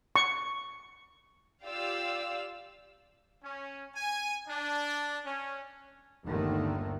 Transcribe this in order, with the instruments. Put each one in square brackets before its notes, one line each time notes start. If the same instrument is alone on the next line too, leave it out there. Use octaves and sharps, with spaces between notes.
[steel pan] C#6
[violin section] F4 G4 D5 F5 E6
[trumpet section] C#4
G#5
D4
C#4
[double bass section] G1 D#2 D3 D#3 A3